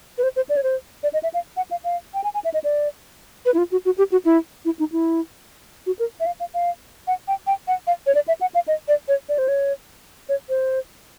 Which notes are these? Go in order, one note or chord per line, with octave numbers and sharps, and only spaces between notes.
B4
C5
C5
D5
C#5
C5
D5
D#5
E5
F5
F#5
F5
F5
G5
G#5
G#5
E5
D#5
D5
B4
E4
F4
F#4
F#4
G4
F#4
E4
E4
D#4
E4
F#4
A#4
E5
F5
F5
F5
F#5
G5
G5
F#5
F5
C#5
D5
E5
F#5
F5
D#5
D5
C#5
D5
C5
C#5
C#5
C5